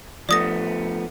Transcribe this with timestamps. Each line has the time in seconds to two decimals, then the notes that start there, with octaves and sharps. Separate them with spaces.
0.29 F3 A3 B3 D5 D#6 A#6